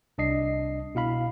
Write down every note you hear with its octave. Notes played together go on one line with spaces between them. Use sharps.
C2 D4 D#5 C7
B2 E4 F5 B5